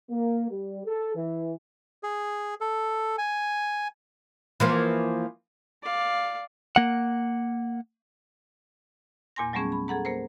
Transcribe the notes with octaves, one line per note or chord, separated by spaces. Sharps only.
A#3
G3
A4
E3
G#4
A4
G#5
E3 F3 A#3
D5 F5
A#3 F#5
E2 A#2 A#3 G#5 C6 A#6
F#3 G3 A3 B3 C#4 G#4
B5
G#4 A4 F#5 A#5
A#3 A#4 C5